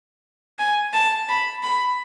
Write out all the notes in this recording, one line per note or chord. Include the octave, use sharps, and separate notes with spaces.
G#5
A5
B5
B5